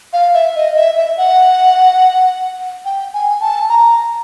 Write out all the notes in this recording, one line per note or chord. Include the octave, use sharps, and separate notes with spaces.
F5
E5
D#5
E5
E5
F#5
G5
G#5
A5
A#5